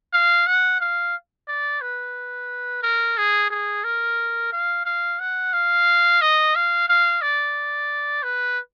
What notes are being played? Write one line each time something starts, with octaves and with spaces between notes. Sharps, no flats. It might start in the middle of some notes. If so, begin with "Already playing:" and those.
F5
F#5
F5
D5
B4
A#4
G#4
G#4
A#4
F5
F5
F#5
F5
D#5
F5
F5
D5
B4